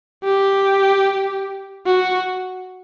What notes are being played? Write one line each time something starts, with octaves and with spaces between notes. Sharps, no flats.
G4
F#4